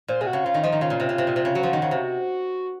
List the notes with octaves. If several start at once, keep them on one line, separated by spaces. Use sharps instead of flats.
A#2 C5
C3 G#4
F#4
C#3
C#3 F4
D#3
F3 D#4
D#3
C#3 F4
A#2
C3
C#3
C3
A#2
C3
C#3
F#3 F#4
F3
D#3
C#3
C3